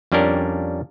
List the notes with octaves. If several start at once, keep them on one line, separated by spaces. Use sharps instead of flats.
F2 G3 C#4 D4 A#4